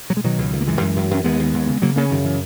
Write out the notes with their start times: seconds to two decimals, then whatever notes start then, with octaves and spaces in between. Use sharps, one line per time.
0.10 B2 F#3
0.17 G#3
0.24 B2 D#3 F#3
0.38 C#2
0.53 C#2
0.61 A#3
0.67 F#2 E3 G#3
0.81 F#2
0.96 F#2
1.11 F#2 C#4
1.24 D#2 G#3 B3
1.39 D#2
1.54 D#2
1.67 C#3
1.82 C#3 F#3 A#3
1.96 C#3 A#3 C#4
2.10 F#2 D#3
2.25 C#3 E3